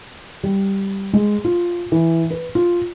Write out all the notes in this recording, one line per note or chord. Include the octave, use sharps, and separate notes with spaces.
G3
G#3
F4
E3
B4
F4